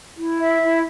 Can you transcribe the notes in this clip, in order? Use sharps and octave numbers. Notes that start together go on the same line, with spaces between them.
E4
E5
E4